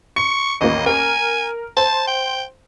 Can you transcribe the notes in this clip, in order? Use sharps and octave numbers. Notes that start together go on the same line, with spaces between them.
C#6 C#7
A1 D#2 A#3 D#5
A#4 G#5
C5 A5
G5